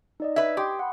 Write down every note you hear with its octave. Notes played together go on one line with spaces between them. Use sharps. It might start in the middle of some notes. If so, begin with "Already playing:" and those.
D#4 D5 D#5
B4 E5 G#6
G4 G5 C6 D#6
F#5 B5